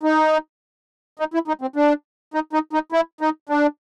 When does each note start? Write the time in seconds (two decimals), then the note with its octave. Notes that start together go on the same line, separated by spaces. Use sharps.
0.03 D#4
1.19 D#4
1.34 E4
1.48 D#4
1.61 C4
1.76 D4
2.34 D#4
2.53 D#4
2.73 D#4
2.92 E4
3.21 D#4
3.49 D4